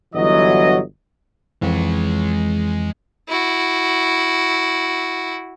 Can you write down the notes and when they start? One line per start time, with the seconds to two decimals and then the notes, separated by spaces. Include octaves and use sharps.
0.15 G1 E3 F#3 D#5
1.62 F2 E3 G#3 C#5
3.29 E4 F#4